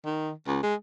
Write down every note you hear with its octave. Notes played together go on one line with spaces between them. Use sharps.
D#3
C#2
G#3